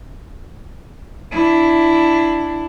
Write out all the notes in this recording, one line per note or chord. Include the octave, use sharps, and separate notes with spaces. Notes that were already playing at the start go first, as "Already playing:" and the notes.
D4 E4